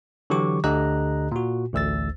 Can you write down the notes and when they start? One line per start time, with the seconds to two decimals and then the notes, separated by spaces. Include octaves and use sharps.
0.30 D3 E3 F#3 G4 C#6 D6
0.64 D2 D3 G4 D#5 A#5 F#6
1.32 A#2 F#4
1.73 A1 D2 E6 A6